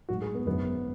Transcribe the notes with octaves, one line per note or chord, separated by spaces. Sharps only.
A1 G#2 F#3 F#4
G#4
B3
G#1 F#2 D3 F#3 B3